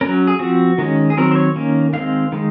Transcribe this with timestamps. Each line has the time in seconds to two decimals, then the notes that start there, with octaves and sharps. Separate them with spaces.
0.01 F#3 C#4 A#4
0.27 G#4
0.39 F3 C4 F#4
0.78 D#3 G#3 C#4
1.10 G#4
1.17 D#3 F#3 C4 A#4
1.31 C5
1.35 C#5
1.56 D#3 A#3 C#4
1.93 D#3 G#3 C4 F5
2.32 D#3 G#3